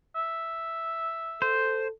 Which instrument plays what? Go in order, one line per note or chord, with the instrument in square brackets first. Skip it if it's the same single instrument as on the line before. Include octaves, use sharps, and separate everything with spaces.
[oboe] E5
[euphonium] A4 [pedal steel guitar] C5